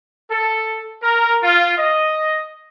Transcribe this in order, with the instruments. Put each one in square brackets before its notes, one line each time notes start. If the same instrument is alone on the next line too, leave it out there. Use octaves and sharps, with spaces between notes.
[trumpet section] A4
A#4
F4
D#5